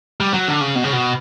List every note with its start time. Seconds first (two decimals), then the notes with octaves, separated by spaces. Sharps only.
0.20 G3
0.33 F#3
0.48 D3
0.61 C#3
0.75 B2
0.84 C#3
0.93 B2